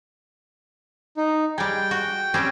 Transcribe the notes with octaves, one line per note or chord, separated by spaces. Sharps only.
D#4
G3 G#3 G5
F#4
G3 C4 C#4